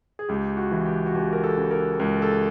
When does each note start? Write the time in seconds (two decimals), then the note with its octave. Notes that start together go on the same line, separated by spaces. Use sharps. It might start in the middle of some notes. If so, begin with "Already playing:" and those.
0.19 G#4
0.29 C#2 G4
0.57 F#4
0.71 E3
0.86 G4
1.06 F#4
1.15 C#2 G4
1.33 A#4
1.44 A4
1.57 C#3
1.71 A#4
2.00 C#2 A#4
2.22 A4